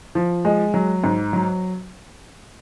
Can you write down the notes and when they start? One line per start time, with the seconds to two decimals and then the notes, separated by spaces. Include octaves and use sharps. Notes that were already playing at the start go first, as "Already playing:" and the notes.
0.15 F3
0.45 G#3
0.74 F#3
1.04 G#2
1.33 F#3